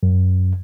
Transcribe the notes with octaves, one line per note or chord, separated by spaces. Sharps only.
F#2